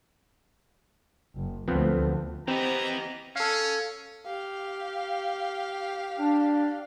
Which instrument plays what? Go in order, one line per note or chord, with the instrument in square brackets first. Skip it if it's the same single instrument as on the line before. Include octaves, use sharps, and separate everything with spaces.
[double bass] F#1
[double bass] D2 A3 [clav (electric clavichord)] F3 B3 C4
[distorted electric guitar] E3 B3 [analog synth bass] C4 [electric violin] G4 D#5 [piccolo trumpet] A#5
[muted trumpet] C#4 [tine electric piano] A4 F5
[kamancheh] G4 F5
[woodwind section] D4